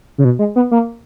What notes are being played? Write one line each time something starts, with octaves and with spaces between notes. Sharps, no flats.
C#3
B2
G#3
B3
A#3